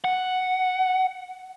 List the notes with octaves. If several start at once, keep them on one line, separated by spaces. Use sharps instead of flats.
F#5